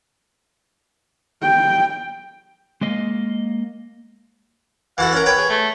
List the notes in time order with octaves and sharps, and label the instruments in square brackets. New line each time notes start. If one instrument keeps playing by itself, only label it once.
[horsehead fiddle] G5
[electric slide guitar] G#3 A#3 D#5 F5
[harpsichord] E3 F#4 A4 [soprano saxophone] F#5
[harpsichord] C#4 A#4
B4 C#5 G5
[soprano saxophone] G#4
A3